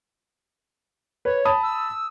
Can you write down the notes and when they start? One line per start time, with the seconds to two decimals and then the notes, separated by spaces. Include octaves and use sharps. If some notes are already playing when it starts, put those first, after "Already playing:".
1.25 B4 C#5
1.45 A5 B5 D#6
1.63 E6